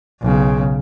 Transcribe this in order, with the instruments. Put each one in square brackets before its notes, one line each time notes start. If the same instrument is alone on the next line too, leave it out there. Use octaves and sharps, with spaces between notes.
[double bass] B1 C#3